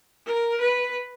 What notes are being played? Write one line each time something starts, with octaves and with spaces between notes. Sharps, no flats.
A#4
B4